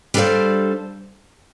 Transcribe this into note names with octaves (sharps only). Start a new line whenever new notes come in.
G3 D4 A4 C5 F5